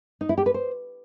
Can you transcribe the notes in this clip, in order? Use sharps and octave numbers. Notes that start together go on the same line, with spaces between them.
D#4
E4
G4
B4
C5